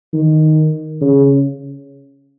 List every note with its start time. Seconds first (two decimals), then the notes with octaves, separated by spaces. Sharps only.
0.14 D#3
1.01 C#3